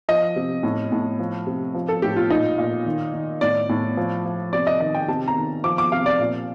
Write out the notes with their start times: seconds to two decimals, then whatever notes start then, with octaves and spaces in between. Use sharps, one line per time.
0.08 F3 D#5
0.36 C3
0.63 A2
0.92 A2
1.19 F3
1.47 C3
1.74 F3
1.89 A4
2.02 A2 G4
2.16 F4
2.30 A#2 D#4
2.58 A#2
2.86 D#3
3.14 D#3
3.41 A2 D5
3.69 A2
3.97 F3
4.26 F3
4.53 C3 D5
4.67 D#5
4.80 D#3 D#5
4.95 G5
5.08 C3 A5
5.28 A#5
5.37 D#3
5.64 F3 D6
5.78 D6
5.92 C3 F5
6.06 D5
6.20 A#2